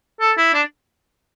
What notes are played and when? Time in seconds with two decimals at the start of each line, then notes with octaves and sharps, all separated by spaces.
0.20 A4
0.37 E4
0.54 D4